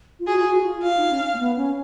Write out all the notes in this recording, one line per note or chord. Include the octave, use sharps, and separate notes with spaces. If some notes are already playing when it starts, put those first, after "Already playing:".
F4
F#4 G#4
F4
F#4
F4
F4 F5
D#4
C#4
A#3
B3
C#4